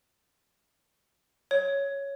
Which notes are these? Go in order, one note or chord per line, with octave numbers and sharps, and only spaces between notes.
C#5